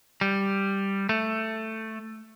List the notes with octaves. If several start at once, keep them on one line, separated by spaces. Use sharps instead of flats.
G3
A3